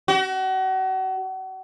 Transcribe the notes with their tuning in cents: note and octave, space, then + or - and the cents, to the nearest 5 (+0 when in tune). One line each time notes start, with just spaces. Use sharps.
F#4 +35